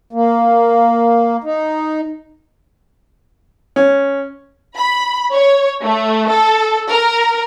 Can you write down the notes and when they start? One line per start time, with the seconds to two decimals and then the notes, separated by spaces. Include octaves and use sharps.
0.13 A#3
1.44 D#4
3.76 C#4
4.76 B5
5.32 C#5
5.82 A3
6.30 A4
6.90 A#4